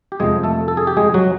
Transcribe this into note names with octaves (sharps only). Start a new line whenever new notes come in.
G4
F2 C3 F3 G#3 G#4
A3 A4
A4
G#4
G4
G#3 G#4
F#3 F#4